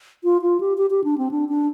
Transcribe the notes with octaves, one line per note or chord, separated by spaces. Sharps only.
F4
F4
G4
G4
G4
D4
C4
D4
D4